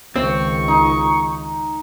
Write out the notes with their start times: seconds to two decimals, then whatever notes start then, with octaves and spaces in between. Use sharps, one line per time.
0.16 C#2 D#3 C4 C6 C#6
0.68 D#4